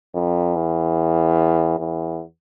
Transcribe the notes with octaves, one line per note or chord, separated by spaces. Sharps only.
F2
E2
E2